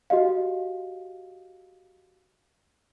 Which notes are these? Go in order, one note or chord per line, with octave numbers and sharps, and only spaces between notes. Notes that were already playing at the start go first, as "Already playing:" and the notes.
F#4 G4 D#5 F5